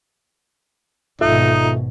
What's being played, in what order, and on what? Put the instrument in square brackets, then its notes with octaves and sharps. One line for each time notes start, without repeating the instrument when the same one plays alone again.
[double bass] G#1 B2 [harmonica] D#4 [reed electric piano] F4 A4 E5